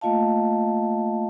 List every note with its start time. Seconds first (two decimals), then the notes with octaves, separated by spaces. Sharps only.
0.01 A3 A#3 F4 D#5 F5 A5